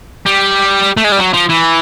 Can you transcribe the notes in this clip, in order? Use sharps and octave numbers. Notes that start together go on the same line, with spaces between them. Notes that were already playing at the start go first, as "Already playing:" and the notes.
G3
A3
G#3
G3
F#3
F3
E3